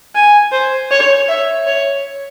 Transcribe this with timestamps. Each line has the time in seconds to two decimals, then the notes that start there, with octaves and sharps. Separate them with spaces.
0.15 G#5
0.52 C5
0.91 C#5
1.29 E5
1.67 C#5